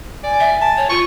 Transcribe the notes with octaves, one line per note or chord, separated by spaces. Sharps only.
D5 G#5
E5
A5
C#5
F4 C#6